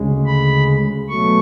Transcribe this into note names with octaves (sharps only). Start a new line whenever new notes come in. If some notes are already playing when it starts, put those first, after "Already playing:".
Already playing: D2 C#3 G#3
B5
B2 F#3 A3 C#6